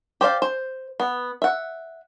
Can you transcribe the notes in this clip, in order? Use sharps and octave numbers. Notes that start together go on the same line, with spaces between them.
G4 C5 D5 F5
C5
B3
E5 F#5